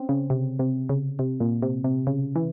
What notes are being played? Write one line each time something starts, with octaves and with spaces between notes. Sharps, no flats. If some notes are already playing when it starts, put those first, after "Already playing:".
Already playing: C4 C#4
C#3
C3
C3
C#3
C3
A#2
C3
C3
C#3
E3